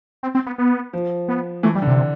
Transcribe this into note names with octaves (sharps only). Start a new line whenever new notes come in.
C4
C4
B3
B3
F3
B3
E3 A3
G3
D3
C3